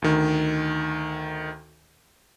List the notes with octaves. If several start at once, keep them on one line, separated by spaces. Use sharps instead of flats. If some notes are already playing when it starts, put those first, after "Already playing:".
D2 D#3